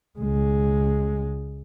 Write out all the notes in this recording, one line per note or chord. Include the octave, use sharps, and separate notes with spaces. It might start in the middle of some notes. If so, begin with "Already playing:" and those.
C#2 G#3